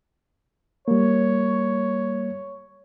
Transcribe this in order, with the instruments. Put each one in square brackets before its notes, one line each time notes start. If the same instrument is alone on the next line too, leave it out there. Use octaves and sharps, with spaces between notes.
[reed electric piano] G3 A#3 [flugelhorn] C#5